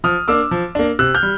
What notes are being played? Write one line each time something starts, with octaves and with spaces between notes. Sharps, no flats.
F3 D#6 F6
A#3 D4 D6 E6
F3
A#3 D4
C3 E6 F#6
F6 G6
G3